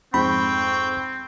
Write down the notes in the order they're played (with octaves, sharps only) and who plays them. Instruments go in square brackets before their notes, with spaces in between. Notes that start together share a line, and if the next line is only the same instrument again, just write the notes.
[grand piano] F2 G#2 [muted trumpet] C4 [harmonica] G5 C#6 [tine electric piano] B5